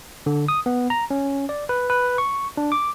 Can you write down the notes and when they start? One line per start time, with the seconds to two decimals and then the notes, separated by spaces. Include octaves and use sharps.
0.26 D3
0.48 D#6
0.66 B3
0.90 A#5
1.11 C#4
1.49 D5
1.69 B4
1.90 B4
2.18 C#6
2.57 D4
2.72 D6